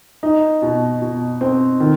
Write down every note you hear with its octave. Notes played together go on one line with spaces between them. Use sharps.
D#4
B2
B2
C4
D#3